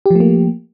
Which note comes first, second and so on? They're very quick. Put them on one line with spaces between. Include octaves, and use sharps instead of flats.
G4 F3 A3 A#3